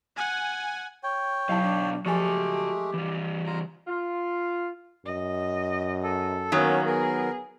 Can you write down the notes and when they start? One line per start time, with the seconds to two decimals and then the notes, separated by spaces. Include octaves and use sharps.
0.17 F#5 G#5
1.03 C#5 G5
1.49 B1 F#3 E4 F5 A5
1.63 D4
2.06 F3 G#3 A3 F#4 G4 G#5 A5
2.94 E3 G3
3.46 F4 A#5
3.87 F4
5.05 F#2 D#5
6.03 A4
6.52 D#3 F#3 A#3 B3 C#4
6.86 B3 G#4 A#4